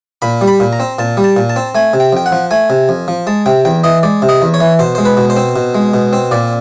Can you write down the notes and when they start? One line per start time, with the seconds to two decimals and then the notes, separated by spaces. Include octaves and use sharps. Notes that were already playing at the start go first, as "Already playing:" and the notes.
0.22 A#2 B5
0.41 G3
0.47 B5
0.60 A#2
0.73 A#5
0.80 C4
0.99 A#2 A5
1.17 G3
1.24 A5
1.37 A#2
1.50 A5
1.56 C4
1.75 A3 G#5
1.94 C3
2.00 G5
2.13 F2 G5
2.26 F#5
2.32 F3
2.51 A3 G#5
2.70 C3
2.89 F2
3.08 F3
3.27 G#3 A5
3.46 C3 G5
3.65 E2 G5
3.84 E3 D#5
4.03 G#3 D5
4.22 C3
4.29 D#5
4.42 E2
4.54 C#5
4.60 E3
4.79 B2 C5
4.95 G#3 C5
5.05 B4
5.17 B2
5.30 C5
5.37 C4
5.56 B2
5.75 G#3
5.94 B2
6.13 C4
6.31 A#2 D5